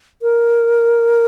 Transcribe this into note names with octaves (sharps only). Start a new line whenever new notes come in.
A#4